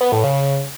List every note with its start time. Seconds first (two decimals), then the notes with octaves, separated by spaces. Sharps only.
0.01 B3
0.12 A2
0.24 C#3